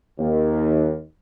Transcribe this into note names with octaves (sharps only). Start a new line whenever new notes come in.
D#2